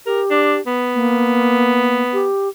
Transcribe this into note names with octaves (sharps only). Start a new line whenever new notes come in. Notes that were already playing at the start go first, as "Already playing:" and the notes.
G4 A#4
D4
B3
A#3
G4